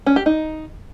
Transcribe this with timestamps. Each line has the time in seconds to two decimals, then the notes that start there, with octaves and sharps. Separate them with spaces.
0.06 C#4
0.16 G4
0.26 D#4